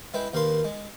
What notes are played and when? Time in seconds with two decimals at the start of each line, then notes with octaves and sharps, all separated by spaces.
0.14 G#3 E4 B4 G5
0.33 D#2 A#4 B4 F5 C6
0.65 G#3